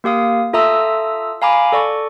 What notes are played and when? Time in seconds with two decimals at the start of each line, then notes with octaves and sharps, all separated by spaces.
0.04 A#3 G4 F5 D#6
0.53 F4 A4 E5 A#5 D#6 E6
1.42 F5 G#5 A#5 B5 D6
1.72 A4 D5 C#6